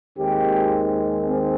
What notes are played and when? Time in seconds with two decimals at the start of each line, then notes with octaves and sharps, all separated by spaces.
0.18 D#2 D#3 G#3 C4 G4
1.27 C4